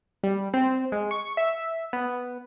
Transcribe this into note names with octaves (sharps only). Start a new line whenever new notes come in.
G3
C4
G#3
C#6
E5
B3